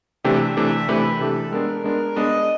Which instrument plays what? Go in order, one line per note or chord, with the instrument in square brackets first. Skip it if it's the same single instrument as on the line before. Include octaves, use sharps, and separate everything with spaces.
[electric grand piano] C3 E3 A3 D4 G4 [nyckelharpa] E5
[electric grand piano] C3 E3 A3 D4 G4 [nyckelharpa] E5
[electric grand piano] C3 E3 A3 D4 G4 [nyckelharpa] B4
[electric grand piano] C3 E3 A3 D4 G4 [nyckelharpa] A4
[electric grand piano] G#3 B3 D4 [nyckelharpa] A#4
[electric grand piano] G#3 B3 D4 [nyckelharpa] A#4
[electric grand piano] G#3 B3 D4 [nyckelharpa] D#5